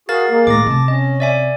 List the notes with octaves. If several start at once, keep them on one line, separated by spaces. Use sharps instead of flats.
F#4 G#4 A#4 F5 A6
G#3 A#3
A2 D#3 D6 A6 A#6
C3 A5
C#4 D#5
D5 E5 G#5